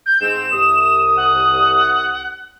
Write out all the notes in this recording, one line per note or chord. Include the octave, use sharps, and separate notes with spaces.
G6
G#2 C4 E7
C2 D#6
F#5